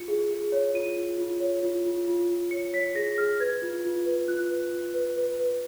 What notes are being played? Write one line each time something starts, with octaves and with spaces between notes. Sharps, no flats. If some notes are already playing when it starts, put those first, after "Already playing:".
Already playing: F4 C#7
G#4
G#4
C#5
F4 D#7
F4
F4
C#5
F4
F4
F4
F4
C#5 C#7
C#5 B6
G#4 A#6
G#4 F6
B4 G#6
F4
F4
B4
F4 F#6
B4
F4
B4
B4
B4